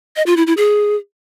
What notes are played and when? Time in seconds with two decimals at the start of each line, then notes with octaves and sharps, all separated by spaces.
0.16 D#5
0.26 F4
0.37 E4
0.47 E4
0.57 G#4